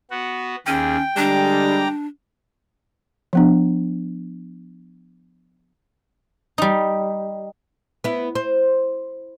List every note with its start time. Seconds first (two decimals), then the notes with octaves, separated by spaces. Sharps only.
0.11 B3 F#4
0.66 D#2 C#4 G#4 G5
1.17 D3 G3 G#3 D4 A#5 D6
3.33 F3 B3 D4
6.58 G3 D#4
8.04 B3 E4
8.35 C5